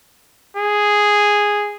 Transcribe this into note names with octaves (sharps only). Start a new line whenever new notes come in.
G#4